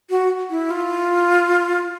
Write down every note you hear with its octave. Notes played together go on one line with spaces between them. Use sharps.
F#4
E4
F4